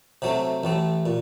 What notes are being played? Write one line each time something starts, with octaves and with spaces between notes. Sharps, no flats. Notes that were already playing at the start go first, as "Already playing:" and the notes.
C3 F#3 A3
A1 A2 A3
A#2